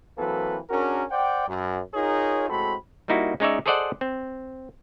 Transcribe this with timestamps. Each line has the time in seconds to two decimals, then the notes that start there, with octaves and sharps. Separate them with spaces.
0.18 E3 F#3 A#3 C4 A4 B4
0.70 C#4 D4 F#4 G#4 A#4
1.11 C5 D5 F#5 G5
1.48 F#2
1.94 D#4 F4 G#4 A#4 C#5
2.49 A2 G#3 C4 F#4 A4 B5
3.08 G3 A#3 D#4 E4 F#4
3.40 G#3 C#4 D#4 C#5 D5 E5
3.66 G#4 A4 C5 D5 D#5 F#5
4.01 C4